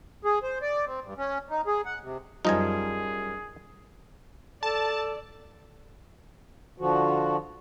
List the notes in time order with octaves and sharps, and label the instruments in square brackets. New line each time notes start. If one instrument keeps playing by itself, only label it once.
[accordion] G#4
C5
D5
C4
G2
C#4
D#4
G#4
F#5
C3
[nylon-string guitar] F#2 G3 [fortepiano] F3 [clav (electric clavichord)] D#4 D#5 G#5 [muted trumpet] G#4
[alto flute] A4 [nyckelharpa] D5 [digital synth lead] A5
[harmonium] D3 F3 F#4